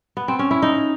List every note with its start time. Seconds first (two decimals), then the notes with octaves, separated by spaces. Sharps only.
0.17 B3
0.28 C4
0.39 C#4
0.51 E4
0.62 D#4